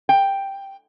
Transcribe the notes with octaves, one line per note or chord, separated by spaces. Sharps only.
G5